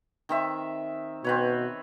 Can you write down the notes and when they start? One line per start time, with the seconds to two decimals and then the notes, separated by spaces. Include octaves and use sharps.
0.29 D#3 C4 E5
1.24 B2 C4 B4 C#5